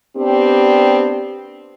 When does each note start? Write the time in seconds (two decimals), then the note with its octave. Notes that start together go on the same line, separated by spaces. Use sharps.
0.16 B3 C4 D4 G4